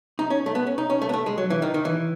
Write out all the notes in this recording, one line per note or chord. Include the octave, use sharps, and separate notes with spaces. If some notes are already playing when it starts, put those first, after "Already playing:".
D#4
C#4
A3
B3
C#4
D#4
C#4
A3
B3
A3
G#3
F#3
E3
D#3
D#3
E3